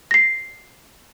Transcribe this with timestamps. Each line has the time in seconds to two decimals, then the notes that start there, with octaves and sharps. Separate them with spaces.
0.11 A#6 C7